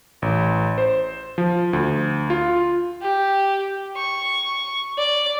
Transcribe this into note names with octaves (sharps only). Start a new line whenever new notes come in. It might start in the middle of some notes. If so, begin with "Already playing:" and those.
A1
C5
F3
D2
F4
G4
C#6
D5